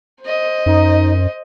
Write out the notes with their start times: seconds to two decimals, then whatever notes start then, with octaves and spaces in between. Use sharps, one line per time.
0.22 C5 D#5
0.66 F#2 D#4